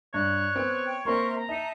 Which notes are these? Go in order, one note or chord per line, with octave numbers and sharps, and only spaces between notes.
G2 C#5 F#6
B3 C4
G5
A#3 C4 A#4 E5 C6 C#6
A#5
D#4 D#5 E5 A5